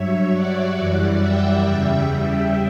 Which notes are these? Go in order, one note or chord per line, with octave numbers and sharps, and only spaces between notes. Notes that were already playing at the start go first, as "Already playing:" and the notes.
Already playing: G2 F#3 C#5 E5
D5 F#5
F#2 E3 G3 D5 F#5
E5 G5
E2 C#3 G3
E5 G5